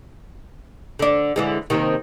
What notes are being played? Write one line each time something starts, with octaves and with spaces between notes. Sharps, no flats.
D3 D4
D3 E3 G#3
D#2 C3 D#3